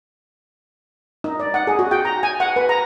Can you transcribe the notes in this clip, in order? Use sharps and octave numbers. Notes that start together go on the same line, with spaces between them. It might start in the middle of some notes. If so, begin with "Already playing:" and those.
D#4
D5
F#5
G#4
F#4
G5
A#5
G#5
F#5
B4
A#5